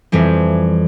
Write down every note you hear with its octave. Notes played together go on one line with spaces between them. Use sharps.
F2 E3 G3 C4